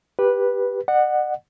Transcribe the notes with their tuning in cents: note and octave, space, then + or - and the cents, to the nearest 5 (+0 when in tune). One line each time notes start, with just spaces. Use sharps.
G4 +5 B4 -10
D5 +45 F#5 +0